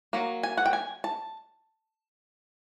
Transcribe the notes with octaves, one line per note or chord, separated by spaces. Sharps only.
F#3 A#3
G#5
F#5
G5
G#5
A5